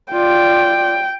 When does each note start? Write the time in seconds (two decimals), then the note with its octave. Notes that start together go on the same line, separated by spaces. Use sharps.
0.13 F4 D5 G5